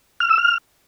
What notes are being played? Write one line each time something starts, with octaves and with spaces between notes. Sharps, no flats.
F6
E6
F6